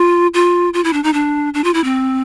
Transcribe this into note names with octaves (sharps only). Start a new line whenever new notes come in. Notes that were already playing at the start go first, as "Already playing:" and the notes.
Already playing: F4
F4
F4
E4
D4
D#4
D4
D4
F4
E4
C4